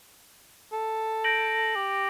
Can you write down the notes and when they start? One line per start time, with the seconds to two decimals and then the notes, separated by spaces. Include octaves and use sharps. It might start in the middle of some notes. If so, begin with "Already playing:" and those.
0.73 A4
1.24 G6 A#6 D7 F#7
1.75 G4